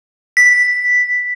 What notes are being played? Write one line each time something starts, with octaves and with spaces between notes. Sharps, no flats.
B6